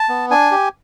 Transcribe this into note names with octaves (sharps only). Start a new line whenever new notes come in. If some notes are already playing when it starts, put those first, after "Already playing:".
Already playing: A5
B3
D4 G#5
G4